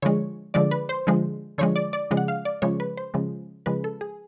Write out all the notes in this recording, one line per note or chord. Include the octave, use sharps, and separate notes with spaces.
D3 F3 G#3 C#5
D3 F3 G#3 D5
B4
C5
D3 F3 G#3
D3 F3 G#3 C#5
D5
D5
C#3 F3 G#3
F#5
F5
D5
C#3 F3 G#3 C#5
B4
C5
C#3 F3 G#3
C#3 F3 G#3 B4
A4
G#4